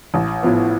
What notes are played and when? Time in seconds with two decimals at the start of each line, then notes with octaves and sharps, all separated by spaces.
0.14 A1
0.43 A2 F3 B3